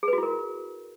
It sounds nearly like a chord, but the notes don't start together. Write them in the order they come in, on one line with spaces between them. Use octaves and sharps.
G#4 B4 F#4 E4 A#4